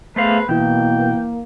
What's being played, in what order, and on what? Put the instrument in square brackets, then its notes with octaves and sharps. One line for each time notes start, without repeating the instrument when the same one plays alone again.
[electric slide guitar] A3 C5 F5 [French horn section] B3 G#4 [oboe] B4
[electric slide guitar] B2 [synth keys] E3 E4 [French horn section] A#3 [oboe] G5